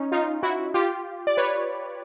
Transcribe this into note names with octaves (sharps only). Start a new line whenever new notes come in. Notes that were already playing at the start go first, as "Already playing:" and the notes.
Already playing: C#4 D#4
D#4 F4
E4 F#4
F4 G4
D5
B4 C#5